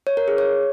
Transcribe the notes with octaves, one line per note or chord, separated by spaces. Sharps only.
C#5
A#4
G#4
C#5